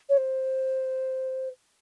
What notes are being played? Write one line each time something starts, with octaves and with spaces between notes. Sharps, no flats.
C#5
C5